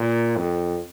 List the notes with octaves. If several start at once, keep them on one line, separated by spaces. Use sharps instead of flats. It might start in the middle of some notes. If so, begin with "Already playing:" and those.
Already playing: A#2
F2